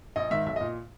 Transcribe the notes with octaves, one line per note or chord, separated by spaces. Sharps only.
A#1 D#5
G#2 D#3 E5
B1 E5
D#5
A#2